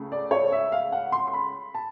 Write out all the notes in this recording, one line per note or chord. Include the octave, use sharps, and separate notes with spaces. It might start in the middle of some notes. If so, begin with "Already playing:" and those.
Already playing: C#2 C#3 A3
D5
C#5
E5
F5
F#5
C6
C6
B5
A5